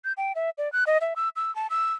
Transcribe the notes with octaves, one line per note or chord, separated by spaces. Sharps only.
G6
G5
E5
D5
F#6
D#5
E5
E6
E6
A5
E6